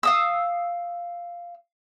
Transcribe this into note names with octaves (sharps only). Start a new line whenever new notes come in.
F5 D#6 E6